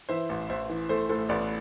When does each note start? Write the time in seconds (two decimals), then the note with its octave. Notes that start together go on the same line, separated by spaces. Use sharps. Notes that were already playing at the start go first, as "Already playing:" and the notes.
0.09 E3 C5 E5
0.29 A1
0.49 A1 C5 E5
0.70 E3
0.89 A3 A4 C5
1.09 A2 A4 C5
1.29 A1 B4 D5